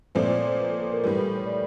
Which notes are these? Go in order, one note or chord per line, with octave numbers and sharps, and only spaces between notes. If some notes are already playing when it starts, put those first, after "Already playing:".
A#2 F3 A3 C4 C5 D5
C5 D5
C#5
C5
B4
A4
A4
A#4
A2 E3 G3 B4
B4
B4
C#5
D5